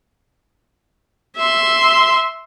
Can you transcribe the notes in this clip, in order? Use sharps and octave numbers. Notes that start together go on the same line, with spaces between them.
E5 C6